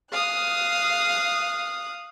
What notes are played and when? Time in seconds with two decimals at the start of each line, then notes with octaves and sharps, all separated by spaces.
0.12 F5 D#6 F#6